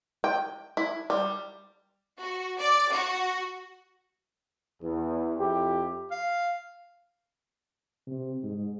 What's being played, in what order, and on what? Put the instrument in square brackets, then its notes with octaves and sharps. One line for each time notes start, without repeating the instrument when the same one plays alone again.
[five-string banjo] G5
E4
G3
[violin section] F#4
D5
F#4
[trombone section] E2
F2 E4 G4
[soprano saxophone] F5
[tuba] C3
G#2